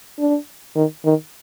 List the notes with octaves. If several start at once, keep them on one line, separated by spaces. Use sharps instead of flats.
D4
D#3
D#3